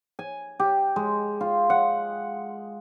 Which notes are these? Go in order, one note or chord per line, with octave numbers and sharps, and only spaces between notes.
G#5
G4
G#3
F4
F#5